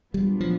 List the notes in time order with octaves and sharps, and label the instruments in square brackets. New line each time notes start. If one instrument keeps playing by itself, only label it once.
[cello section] A#2 F#3 B3 D4 F4 [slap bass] G3
[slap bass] F3